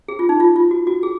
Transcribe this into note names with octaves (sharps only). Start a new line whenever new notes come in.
G#4
F4
D#4
F4
F4
F#4
F#4
G#4